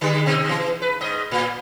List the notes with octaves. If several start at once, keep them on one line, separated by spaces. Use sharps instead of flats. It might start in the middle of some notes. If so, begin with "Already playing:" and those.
D3 G3 G#3
B2 C4 D#4
E3
B4
G#2 D#5
A2